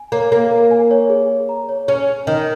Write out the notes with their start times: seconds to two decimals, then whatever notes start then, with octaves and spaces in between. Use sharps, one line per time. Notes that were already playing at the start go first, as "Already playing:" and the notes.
Already playing: G#5
0.12 A#3 C#5
0.32 A#3 A#4
0.51 A#4
0.71 G#5
0.91 C#5
1.10 G#4
1.30 G#4
1.49 A#5
1.69 C#5
1.88 C#4 G#4
2.09 G#4
2.27 D#3 A#5